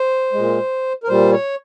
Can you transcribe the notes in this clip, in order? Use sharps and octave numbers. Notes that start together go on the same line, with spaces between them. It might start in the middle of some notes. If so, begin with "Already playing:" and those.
Already playing: C5
A#2 G#3
A#4
A#2 G3 C5
C#5